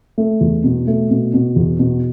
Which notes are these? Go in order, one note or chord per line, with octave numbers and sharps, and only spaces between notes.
A3
E2
B2
A3
B2
B2
E2
B2